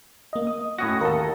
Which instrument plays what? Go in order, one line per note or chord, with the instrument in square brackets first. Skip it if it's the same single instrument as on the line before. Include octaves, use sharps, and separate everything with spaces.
[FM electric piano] A#3 D#5
D#6
[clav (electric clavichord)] A2 C#4 F#4 [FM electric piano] C#6 D#6 A#6
[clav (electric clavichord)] D#2 A4 [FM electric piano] A#4